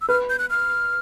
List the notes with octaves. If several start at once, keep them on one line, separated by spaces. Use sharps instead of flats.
E6
B4 F6
G6
F#6
F6